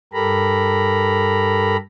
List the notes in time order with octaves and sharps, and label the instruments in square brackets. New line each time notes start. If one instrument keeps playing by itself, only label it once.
[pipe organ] G2 G4 A4 A#4 A#5 B5